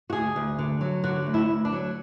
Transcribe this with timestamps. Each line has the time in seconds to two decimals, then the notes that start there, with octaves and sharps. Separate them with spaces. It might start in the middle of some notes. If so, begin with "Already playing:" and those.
0.10 F#4
0.13 D2 G#4
0.36 D2
0.59 D3
0.81 F#3
1.04 D3 F#4
1.27 D2
1.34 E4
1.49 D2
1.65 D4
1.72 F#3